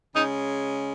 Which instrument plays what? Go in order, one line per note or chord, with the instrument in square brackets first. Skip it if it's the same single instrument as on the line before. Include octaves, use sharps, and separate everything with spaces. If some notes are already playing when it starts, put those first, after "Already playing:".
[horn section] C#3 G#3 D#4